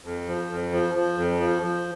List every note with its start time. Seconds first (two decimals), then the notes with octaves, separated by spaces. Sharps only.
0.05 F2
0.27 F3
0.50 F2
0.72 F3
0.95 F3
1.17 F2
1.39 F3
1.62 F3